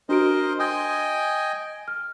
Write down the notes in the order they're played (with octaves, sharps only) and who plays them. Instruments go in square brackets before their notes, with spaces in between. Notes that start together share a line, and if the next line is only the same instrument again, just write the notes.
[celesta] D4 F#4 D7 [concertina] A#4 C5 D#5
[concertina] D#5 G5 G#5 [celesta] C6 D#6 G6
[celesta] F6